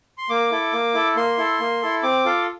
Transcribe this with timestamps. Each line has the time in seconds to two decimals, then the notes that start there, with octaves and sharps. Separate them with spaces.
0.18 C6
0.30 A#3 D6
0.51 E4 A4
0.73 A#3
0.94 E4 A4
1.16 A#3 C6
1.38 E4 A4
1.60 A#3
1.82 E4 A4
2.03 C4 D6
2.25 F4 A4